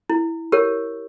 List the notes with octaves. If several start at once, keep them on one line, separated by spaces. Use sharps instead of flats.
E4
G4 A#4 C#5